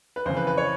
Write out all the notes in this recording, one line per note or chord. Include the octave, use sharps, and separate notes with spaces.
B4
F2 C#3 E3 C5
B4
B4
C#5